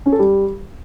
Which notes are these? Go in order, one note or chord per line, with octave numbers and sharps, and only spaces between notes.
C#4
A4
G3